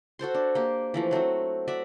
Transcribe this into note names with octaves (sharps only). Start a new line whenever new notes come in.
F#4 A4 C5 C6
D4
A#3 G4
E3 F3 A3
F#3 A3 C4 F#4
F#4 D5 E5